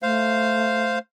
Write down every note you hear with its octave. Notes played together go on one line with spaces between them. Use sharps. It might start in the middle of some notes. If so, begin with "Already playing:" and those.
A3 C5 F5